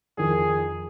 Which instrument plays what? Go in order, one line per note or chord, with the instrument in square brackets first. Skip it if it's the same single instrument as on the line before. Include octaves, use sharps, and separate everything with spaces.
[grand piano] F2 D#3 [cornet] G#4